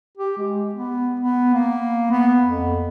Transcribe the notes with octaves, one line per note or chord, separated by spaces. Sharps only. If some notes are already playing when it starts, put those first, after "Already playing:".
G4
G#3
B3
B3
A#3
B3
F2